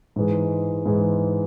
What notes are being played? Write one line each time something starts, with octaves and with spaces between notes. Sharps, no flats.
G#2 E3 G#3
G#2 E3 G#3